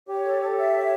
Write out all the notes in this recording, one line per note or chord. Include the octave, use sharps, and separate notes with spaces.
G4 C#5
A4
A4
E5
C#5